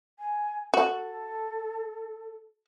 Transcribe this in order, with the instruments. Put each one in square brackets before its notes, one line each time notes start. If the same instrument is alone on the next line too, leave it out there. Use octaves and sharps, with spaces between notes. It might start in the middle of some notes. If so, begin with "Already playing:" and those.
[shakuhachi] G#5
[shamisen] F#4 [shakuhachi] A4